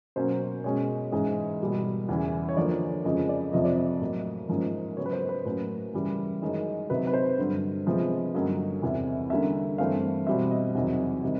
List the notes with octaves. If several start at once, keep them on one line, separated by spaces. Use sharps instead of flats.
B2 F#3 A#3 C#4 C5
B2 G#3 C#4 C#5
G#2 E3 G#3 C#4
B2 G3 A#3
E2 C#3 E3
C#5
D3 F3 A#3 D5
F2 C#3 F3 G#3 D#5
D5
F2 C3 F3 D#5
D5
D#5
A2 F#3 A#3
G#2 F3 A#3 C#4
C#3 F#3 B3 C#5
B4
C5
B4
A2 F#3 A#3 C#4 A#4
C#3 E3 G3
F#2 D#3 G#3
C3 D#3 F#3 B4
B4
C5
G2 D3 F#3
C3 F3 G#3 B3
G2 D3 F#3 A#3 C#4 D#5
E2 C3 E3
D3 G3 A#3 C#4 E5
G2 E3 A3 C4 F5
B2 G3 C4 E5
D#5
E2 C3 D#3 F#3
C3 D#3 G3 C4